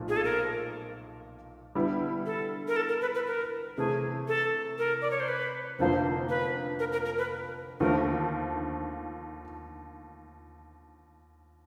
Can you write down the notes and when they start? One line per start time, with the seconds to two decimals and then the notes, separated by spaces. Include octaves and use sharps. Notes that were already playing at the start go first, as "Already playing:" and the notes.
Already playing: B1 A#2 F3 A3
0.09 G#4
0.17 A4
0.24 A#4
1.75 D3 G3 B3 E4
2.26 A4
2.68 A#4
2.76 A4
2.89 A#4
3.01 B4
3.15 B4
3.27 A#4
3.77 C3 E3 A3 G#4
4.28 A4
4.78 A#4
5.01 D5
5.11 C#5
5.20 C5
5.28 B4
5.79 F1 F2 D3 F3 A#3 C5
6.29 B4
6.79 A#4
6.92 A#4
7.05 A#4
7.18 B4
7.80 D#2 D3 F3 A3 A#4